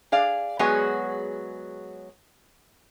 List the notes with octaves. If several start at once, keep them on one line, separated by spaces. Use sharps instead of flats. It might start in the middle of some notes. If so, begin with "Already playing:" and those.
G#4 D5 F5
F#3 G#3 B3 F#4 G#4 C#5